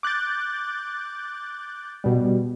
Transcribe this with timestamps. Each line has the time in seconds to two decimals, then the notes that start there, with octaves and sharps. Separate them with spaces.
0.03 D6 F#6 G6 A6
2.04 B2 G3